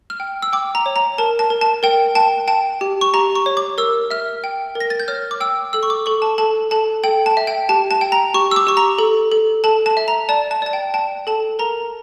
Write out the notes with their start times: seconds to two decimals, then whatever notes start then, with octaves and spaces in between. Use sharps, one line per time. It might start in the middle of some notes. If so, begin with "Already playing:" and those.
0.10 F6
0.20 G5
0.42 E6
0.53 G5 D6
0.75 A#5
0.86 C#5
0.96 A#5
1.18 A#4 A5
1.39 A5
1.50 A#4
1.61 A5
1.83 A#4 G5
2.15 G5 A5
2.48 G5 A5
2.81 G4
3.01 C#6
3.14 G4 A#5
3.35 C#6
3.46 C#5
3.57 D6
3.78 A#4 E6
4.10 E5 F6
4.44 G5
4.75 A#4
4.80 A#6
4.90 A6
5.00 G6
5.08 C#5 F6
5.31 D6
5.40 G5 E6
5.73 A4 E6
5.83 C#6
5.90 D6
6.06 A4 C#6
6.22 A5
6.38 A4 A5
6.71 A4 A5
7.04 A4 G5
7.26 A5
7.37 E5
7.47 G5
7.69 G4 A5
7.91 A5
8.01 G5
8.12 A#5
8.34 G4 C#6
8.51 E6
8.56 D6
8.67 G4 C#6
8.77 A#5
8.98 A4
9.32 A4
9.64 A4 A5
9.86 A5
9.97 E5
10.08 A#5
10.29 D5 A5
10.51 A5
10.62 D5 A5
10.73 G5
10.94 G5 A5
11.27 A4 A5
11.59 A#4 A#5